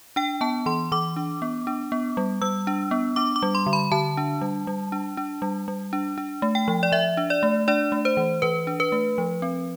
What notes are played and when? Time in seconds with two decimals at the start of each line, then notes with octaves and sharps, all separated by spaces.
0.16 D4 G5
0.41 B3 A5
0.66 E3 C6
0.92 E3 D6
1.16 D4
1.42 B3
1.67 D4
1.92 B3
2.17 G3
2.41 G3 E6
2.67 D4
2.91 B3
3.16 D4 D6
3.36 D6
3.42 G3
3.55 C6
3.66 D3
3.73 B5
3.92 D3 A5
4.17 D4
4.41 G3
4.67 G3
4.92 D4
5.17 D4
5.42 G3
5.68 G3
5.93 D4
6.18 D4
6.42 A3
6.55 G5
6.68 F3
6.83 D5
6.92 F3 E5
7.17 D4
7.30 D5
7.43 A3
7.68 D4 D5
7.92 A3
8.05 C5
8.17 E3
8.42 E3 B4
8.67 D4
8.80 B4
8.92 A3
9.18 F3
9.42 C4